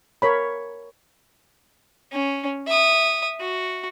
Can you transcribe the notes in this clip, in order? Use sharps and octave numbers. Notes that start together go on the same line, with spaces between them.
A#4 C#5 B5
C#4
E5 D#6
F#4